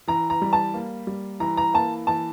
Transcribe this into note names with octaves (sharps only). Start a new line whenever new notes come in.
E3 A#5
A#5
G3
A5
A#3
G3
E3 A#5
A#5
A#3 A5
E3 A5